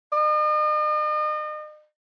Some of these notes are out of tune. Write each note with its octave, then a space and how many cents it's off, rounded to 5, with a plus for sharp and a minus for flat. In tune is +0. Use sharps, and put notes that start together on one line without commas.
D#5 -40